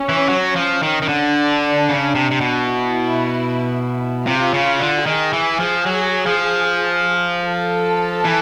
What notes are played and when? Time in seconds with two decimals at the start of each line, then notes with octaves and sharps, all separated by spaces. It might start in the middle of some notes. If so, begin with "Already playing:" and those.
Already playing: C#4
0.09 E3
0.29 F#3
0.56 F3
0.83 D#3
1.02 D#3
1.08 D3 D4
1.89 C#3
2.15 C3
2.31 C3
2.41 B2
2.68 E4
4.27 C3 F4
4.54 C#3
4.80 D3
5.06 D#3 G#4
5.33 E3
5.60 F3
5.86 F#3
6.26 F3
7.45 A4
8.25 E3